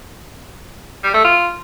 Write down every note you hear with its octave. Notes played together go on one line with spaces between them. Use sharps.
G3
A3
F4